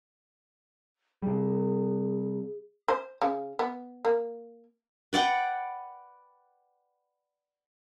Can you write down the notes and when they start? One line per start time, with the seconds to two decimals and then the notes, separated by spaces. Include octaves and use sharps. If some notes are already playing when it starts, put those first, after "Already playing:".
1.22 C3 G3 G#4
2.88 C5
3.22 C#3
3.59 B3
4.05 A#3
5.13 B4 D5 F#5 G5